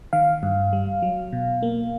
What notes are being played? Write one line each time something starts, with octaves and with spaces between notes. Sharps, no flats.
D#3 F5
G2
G3
F#3
B2
A#3